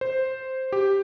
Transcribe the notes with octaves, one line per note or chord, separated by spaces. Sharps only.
C5
G4